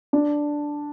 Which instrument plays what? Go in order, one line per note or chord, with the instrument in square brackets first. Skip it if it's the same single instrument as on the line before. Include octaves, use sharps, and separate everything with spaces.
[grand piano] D4